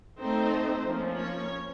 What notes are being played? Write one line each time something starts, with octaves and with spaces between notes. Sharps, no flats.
A3 C4 D#4 C5
F3 A#3 C#4
C#5